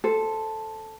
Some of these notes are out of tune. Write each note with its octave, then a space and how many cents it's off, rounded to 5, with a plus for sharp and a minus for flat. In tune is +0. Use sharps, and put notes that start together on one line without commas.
A4 +0 C5 +0